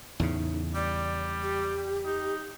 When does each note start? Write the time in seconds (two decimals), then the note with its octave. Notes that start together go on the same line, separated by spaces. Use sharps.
0.20 E2 A2 C#3 D#4
0.75 G3 D5
1.43 G4
2.05 D#4